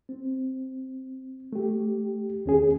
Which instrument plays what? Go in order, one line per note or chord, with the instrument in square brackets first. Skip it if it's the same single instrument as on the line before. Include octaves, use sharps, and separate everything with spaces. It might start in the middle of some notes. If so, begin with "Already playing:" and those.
[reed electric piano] C4
A3 G4
D#2 C#4 G#4